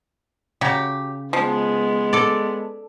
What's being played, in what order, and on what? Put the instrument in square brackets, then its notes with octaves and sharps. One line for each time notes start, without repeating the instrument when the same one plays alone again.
[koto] C#3 [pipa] F#3 G4
[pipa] F3 [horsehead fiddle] G#3 B3
[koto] A4 D5